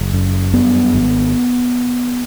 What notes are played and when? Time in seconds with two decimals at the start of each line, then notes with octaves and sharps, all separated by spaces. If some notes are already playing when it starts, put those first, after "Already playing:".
Already playing: F#1
0.13 F#2
0.53 G2 B3
0.94 G#1